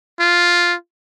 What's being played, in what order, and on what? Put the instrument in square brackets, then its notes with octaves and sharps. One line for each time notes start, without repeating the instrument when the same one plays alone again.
[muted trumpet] F4